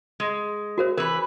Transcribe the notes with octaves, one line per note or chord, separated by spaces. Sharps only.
G#3
F#4 A#4 C5
E3 A#4 B4